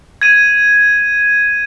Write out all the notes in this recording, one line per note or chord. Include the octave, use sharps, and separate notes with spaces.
G#6 D#7